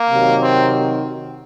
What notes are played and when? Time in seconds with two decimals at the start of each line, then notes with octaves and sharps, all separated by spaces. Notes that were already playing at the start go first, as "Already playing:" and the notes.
Already playing: A#3
0.11 C3 D#3 F#3
0.41 C4